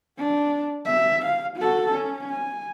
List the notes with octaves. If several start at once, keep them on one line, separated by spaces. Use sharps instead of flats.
D4
E5
F5
F#4 A4
C#4
G#5